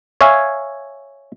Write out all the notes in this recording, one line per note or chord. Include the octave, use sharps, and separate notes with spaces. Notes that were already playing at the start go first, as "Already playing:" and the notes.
C#5 E5 F5 G#5